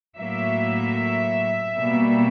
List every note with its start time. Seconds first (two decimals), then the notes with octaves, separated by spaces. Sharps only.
0.17 A2 F#3 A#3 E5
1.76 B2 G3 A#3